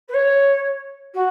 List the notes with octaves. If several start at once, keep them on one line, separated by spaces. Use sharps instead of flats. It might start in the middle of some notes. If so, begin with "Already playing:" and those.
B4
C#5
F#4